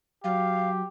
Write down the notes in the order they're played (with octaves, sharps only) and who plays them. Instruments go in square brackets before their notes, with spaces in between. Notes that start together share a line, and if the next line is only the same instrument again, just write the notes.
[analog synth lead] F#3 [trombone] G4 [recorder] F5